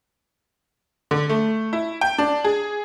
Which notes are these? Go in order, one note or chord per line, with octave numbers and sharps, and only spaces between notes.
D3
A3
E4
G5
D4
G#4